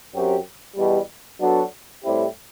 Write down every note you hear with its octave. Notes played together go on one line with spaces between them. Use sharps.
F#2 F#3 C4 G4
E2 B2 G3
F#3 B3 D4 F#4 A4
A2 G3 C4 E4 G4